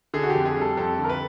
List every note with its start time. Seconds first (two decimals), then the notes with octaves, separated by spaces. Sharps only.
0.14 D3 G#4
0.23 F#4
0.30 G4
0.35 F2
0.45 G#4
0.56 G3
0.61 A4
0.77 F2 A4
0.99 D3
1.04 A#4
1.09 B4